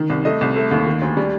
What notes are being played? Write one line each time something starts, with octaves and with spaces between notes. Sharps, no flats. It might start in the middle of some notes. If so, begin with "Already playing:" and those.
Already playing: D#3
C2
A3 D#5
C2
A3
D#2
D#3
D2
G3